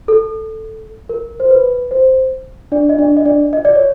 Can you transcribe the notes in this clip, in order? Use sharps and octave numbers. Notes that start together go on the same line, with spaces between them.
A4
A#4
C5
B4
C5
D4 D5
D#5
D4 D5
D#5
D4 D5
D#5
D5
C#5